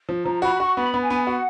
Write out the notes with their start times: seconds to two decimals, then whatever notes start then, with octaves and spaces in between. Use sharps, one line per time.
0.09 F3
0.25 F3 A#5
0.42 F#4 B5
0.54 B5
0.59 F#4 C#6
0.76 B3 B5
0.94 B3
1.02 G#5
1.10 B3
1.27 F#4 F#5